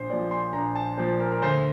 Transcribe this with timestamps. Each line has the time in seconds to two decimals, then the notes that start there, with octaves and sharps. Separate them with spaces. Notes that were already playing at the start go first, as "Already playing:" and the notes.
Already playing: A#1 C5
0.10 A#2 D5
0.13 F3
0.31 C6
0.53 A#1 A#5
0.75 A5
0.98 A#2 F3 C5
1.20 A#4
1.32 A#4
1.42 D2 C5